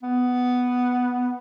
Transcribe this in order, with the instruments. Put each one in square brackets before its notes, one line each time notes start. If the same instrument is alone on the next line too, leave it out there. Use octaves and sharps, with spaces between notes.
[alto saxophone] B3